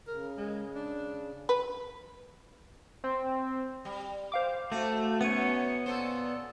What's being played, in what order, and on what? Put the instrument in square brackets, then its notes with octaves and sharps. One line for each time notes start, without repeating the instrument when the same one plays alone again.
[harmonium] C#3 [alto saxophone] A#4
[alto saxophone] G#3
D4
[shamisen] B4
[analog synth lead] C4
[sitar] G3
[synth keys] C5 F5 D6
[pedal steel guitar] A3 [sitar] F#4
[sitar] F#2 [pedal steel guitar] B3 C#5 [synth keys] C#7 D#7
[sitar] A#2 A4 C5